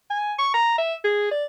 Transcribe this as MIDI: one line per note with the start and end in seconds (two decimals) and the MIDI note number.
0.10 0.33 80
0.38 0.50 85
0.53 0.75 82
0.78 0.94 76
1.04 1.31 68
1.31 1.45 74